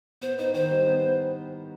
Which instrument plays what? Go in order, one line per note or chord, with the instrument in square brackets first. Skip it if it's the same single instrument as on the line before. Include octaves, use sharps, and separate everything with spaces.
[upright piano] B3 [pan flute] C5
[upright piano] D#4 [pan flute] C5
[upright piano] D#3 [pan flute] C5
[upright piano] G3
B3